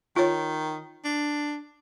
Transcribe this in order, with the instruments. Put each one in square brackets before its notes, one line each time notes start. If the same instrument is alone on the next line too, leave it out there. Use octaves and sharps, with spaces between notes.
[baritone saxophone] D#3 [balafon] F4 C#5
[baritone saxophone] D4